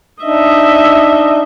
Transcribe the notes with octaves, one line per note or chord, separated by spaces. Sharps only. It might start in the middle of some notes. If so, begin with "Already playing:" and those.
D4 D#4 D#5 E5